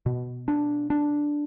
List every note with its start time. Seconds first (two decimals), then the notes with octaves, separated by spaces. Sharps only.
0.06 B2
0.48 D4
0.90 D4